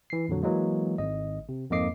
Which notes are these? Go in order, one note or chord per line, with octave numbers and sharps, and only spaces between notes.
E3 C7
F2 A#2 D3 F#3
E3 F#3 G#3 A#3
G#1 D#5
C3
F2 G#2 A#3 D#5 D6 C7